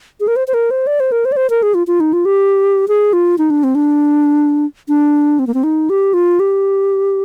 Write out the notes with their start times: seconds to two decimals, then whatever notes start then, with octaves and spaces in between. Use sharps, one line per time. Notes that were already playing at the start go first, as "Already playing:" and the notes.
0.20 G#4
0.28 A#4
0.36 C5
0.48 C5
0.54 A#4
0.71 C5
0.87 D5
1.00 C5
1.12 A#4
1.25 C5
1.32 D5
1.37 C5
1.50 A#4
1.63 G#4
1.74 F4
1.87 F4
2.00 D#4
2.13 F4
2.25 G4
2.88 G#4
3.13 F4
3.38 D#4
3.50 D4
3.64 C4
3.75 D4
4.88 D4
5.39 C4
5.47 A#3
5.54 C4
5.64 D#4
5.90 G4
6.14 F4
6.40 G4